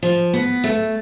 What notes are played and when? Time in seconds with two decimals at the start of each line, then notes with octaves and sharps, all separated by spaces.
0.03 F3
0.34 B3
0.64 A3